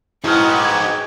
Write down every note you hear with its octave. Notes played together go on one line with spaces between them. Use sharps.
G#2 D#4 E4 F#4 B4 G5 C#6 F6
D6 G#6